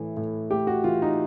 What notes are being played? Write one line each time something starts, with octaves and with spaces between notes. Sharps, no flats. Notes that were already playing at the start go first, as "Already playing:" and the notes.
Already playing: A2 E3
A2
A3 G4
F#4
E3 F4
D#4